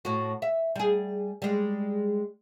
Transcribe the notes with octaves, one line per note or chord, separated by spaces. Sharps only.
A2 F#4
E5
G3 G#4
G3 G#3